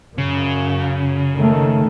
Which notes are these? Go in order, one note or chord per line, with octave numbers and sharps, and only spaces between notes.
F#2 C#3
D#3 A3